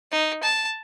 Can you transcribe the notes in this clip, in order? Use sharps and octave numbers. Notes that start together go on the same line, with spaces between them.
D#4
A5